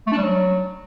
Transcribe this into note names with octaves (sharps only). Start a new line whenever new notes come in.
A3
D4
G3
F#3